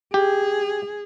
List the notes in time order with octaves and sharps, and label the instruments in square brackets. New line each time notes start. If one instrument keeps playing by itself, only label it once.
[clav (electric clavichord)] G4 [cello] G#4